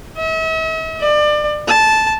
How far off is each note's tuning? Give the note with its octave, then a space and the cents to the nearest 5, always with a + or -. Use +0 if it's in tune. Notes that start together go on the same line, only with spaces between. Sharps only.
E5 -45
D5 +30
A5 -10